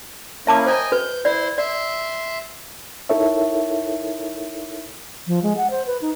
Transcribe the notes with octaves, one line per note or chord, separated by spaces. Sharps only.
A#3 C#4 E4 E5 A5 D6
C5 D#5 G5 G#5 A#5
F#4 B4 G6
E4 C5 D5 C6
D5 E5 C6
D#4 E4 A4 A#4 C#5 E5
F3
G#3
F#5
C5
B4
D#4